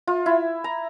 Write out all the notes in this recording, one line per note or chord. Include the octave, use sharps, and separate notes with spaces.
F4
E4
A#5